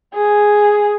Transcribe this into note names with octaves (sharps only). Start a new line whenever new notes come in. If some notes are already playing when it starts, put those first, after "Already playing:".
G#4